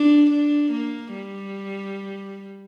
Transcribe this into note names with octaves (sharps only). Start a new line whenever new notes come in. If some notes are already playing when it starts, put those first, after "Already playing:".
Already playing: D4
D4
A#3
G3